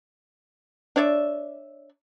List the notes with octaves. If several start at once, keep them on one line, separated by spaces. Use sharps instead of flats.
D4 C#5 D5 E5